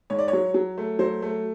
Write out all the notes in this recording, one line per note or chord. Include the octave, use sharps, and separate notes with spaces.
G#2 C#5
D5
C#5
F#3
F#3
A3
F#3 C5
A3